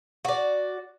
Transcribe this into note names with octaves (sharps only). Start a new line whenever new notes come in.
F#4 D5